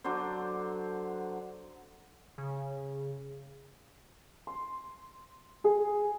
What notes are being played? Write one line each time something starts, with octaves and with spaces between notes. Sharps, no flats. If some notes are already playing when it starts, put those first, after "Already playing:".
D3 F#3 D4 C5
C#3
C6
G#4